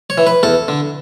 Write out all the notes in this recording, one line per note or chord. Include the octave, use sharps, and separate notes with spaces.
C#5
E3
B4
E2 A4
D3